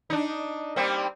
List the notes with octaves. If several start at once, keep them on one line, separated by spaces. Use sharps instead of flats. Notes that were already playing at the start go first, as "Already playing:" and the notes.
D4 D#4
G3 A#3 C4